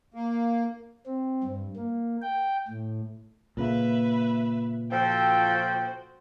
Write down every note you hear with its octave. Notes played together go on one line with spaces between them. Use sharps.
A#3
C4
G2
A#3
G5
A2
A#2 C#3 A#3 B4 E5
F3 F#4 A4 C5 G5